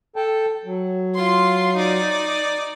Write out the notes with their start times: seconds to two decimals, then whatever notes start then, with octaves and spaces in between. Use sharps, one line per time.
0.16 A4 G5 A5
0.65 F#3
1.15 F4 C6
1.76 D#4 D5